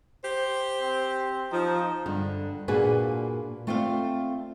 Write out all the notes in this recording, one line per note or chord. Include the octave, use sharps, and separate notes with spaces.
G4 C5
C4
F3 D#4
G2 D3
A#2 A#3 D4 F#4 G#4 B4
A3 C4 F4 A4 D5 F5